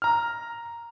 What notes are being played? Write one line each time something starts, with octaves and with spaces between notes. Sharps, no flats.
A#5 F6